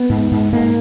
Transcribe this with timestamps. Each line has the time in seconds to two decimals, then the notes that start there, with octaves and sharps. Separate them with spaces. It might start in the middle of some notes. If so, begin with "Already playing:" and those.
Already playing: B3
0.10 G#2
0.32 G#2
0.52 G#2 A#3